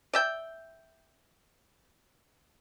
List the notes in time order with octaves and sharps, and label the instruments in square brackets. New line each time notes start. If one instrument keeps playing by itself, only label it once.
[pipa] D5 E5 G5